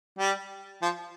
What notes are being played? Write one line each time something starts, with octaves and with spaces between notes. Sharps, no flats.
G3
F3